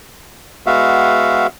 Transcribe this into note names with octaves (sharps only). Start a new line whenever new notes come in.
G#3 B3 F#4 E5 F5